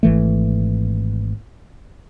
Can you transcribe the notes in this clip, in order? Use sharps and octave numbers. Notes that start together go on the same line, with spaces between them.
G#1 E3 A3